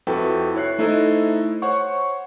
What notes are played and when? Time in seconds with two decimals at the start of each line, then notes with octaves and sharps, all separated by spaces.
0.07 F2 E4 F#4 A4 B4 G5
0.55 E4 C#5 F#6 C7
0.78 A3 D#4 E4 A4 C5 D#5
1.62 C5 C#5 F#5 C#6